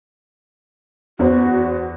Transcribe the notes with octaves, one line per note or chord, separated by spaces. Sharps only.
E2 F#4 C5